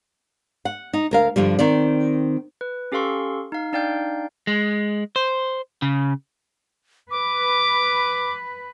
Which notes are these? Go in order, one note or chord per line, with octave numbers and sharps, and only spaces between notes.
F#5
D#4
D2 A#4 F5
G2 D3 F3 G3
D#3 C4 D5
B4
C#4 G4 A4 F5 C6 C#6
D#4 F5
D4 D#4 D5 F5 G5 G6
G#3
C5
C#3
B4 D6